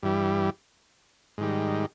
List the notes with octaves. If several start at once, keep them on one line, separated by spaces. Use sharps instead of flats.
G2 E3 G3
G#2 D#3 G3